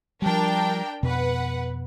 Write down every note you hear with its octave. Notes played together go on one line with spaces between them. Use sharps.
F3 G3 D4 A#4 G5
F2 B2 B4 F#5